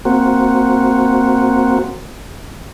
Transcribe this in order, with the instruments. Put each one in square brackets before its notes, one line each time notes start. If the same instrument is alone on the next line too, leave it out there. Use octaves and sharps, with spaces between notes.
[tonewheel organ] A#3 C4 F#4